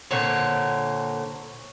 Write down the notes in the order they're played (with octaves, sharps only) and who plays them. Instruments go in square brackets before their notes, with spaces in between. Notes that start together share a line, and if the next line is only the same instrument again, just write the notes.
[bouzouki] A#2 D3 C4 C#5